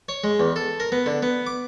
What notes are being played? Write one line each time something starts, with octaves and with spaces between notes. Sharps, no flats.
C#5
G#3
E2
A4
A#4
B3
D3
B3
D6